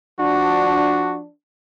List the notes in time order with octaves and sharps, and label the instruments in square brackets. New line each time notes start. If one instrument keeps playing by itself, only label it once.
[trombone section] F3 D4 [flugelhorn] F#4